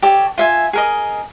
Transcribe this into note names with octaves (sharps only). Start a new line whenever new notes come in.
G4 A4 C#5 D5
F4 E5 G#5
G#4 A#4 D#5